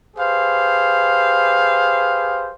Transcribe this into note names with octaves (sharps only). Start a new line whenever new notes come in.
G4 G#4 B4 C5 F5